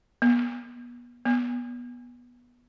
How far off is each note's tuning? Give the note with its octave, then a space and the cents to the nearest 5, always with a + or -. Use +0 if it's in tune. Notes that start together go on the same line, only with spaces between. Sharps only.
B3 -35
B3 -20